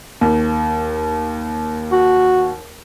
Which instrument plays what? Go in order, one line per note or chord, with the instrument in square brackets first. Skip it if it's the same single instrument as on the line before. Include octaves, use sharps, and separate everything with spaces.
[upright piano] D#2
[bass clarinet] F#4